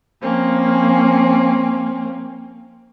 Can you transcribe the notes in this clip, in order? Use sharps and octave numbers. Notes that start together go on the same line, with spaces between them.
F3 A#3 C4 C#4